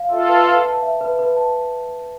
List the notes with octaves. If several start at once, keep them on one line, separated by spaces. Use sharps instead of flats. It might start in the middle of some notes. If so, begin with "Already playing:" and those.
Already playing: F5
F4 A4 E5
B4
B4
A5
E5
B4
B4
A5